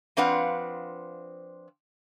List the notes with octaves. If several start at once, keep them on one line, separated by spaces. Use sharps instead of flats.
F3 C4 D4 B4 F5 F#5